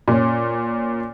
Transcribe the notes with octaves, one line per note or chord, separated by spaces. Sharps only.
A#2 C#4